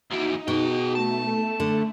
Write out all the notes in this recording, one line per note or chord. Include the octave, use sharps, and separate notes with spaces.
D#2 E3 D#4 F#4
B2 F#4 G#4 G5
A3 A5
A4
D3